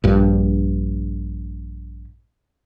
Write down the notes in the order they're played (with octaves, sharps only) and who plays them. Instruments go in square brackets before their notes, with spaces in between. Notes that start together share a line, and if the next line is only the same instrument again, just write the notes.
[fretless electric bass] A#1 G2